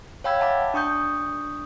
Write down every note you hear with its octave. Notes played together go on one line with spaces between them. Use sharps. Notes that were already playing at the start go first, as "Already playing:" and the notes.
C#5 F5 G5 B5 E6 G#6
E5 F#5 G5 A5 B5 D6
D4 C#6 D#6 G6